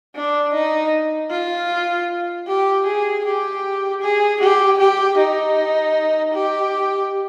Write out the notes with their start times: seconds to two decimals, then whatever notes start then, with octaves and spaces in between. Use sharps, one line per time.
0.15 D4
0.54 D#4
1.31 F4
2.47 G4
2.86 G#4
3.25 G4
4.02 G#4
4.41 G4
4.79 G4
5.18 D#4
6.34 G4